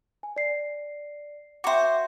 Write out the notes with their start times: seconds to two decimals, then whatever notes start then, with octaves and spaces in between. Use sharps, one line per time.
0.23 G#5
0.36 D5 C7
1.64 F#4 C5 E5 G5 D6